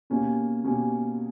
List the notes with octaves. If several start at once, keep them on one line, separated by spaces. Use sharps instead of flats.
B2 A#3 C#4 G4
B2 A#3 C#4 G4